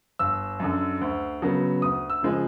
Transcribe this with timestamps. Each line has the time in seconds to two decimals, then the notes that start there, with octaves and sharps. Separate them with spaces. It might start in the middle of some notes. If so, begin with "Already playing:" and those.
0.19 G1 E6
0.60 F#2 D3
1.01 D2
1.42 C#3 F#3 B3
1.82 D2 D#6
2.10 E6
2.23 C#3 F3 G#3